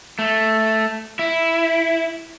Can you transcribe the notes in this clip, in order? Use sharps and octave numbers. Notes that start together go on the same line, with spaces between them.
A3
E4